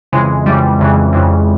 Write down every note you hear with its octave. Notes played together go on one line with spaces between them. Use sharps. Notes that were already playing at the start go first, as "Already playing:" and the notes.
F2 C#3 E3 G#3
F2 C#3 E3 G3
F2 C#3 E3
F2 C#3 E3